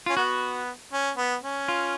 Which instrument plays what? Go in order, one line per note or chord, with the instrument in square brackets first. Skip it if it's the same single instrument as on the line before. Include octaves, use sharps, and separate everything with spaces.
[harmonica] C#4 [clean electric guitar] F4
[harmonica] B3 [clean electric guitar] F#4
[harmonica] C#4
B3
C#4
[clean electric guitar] F4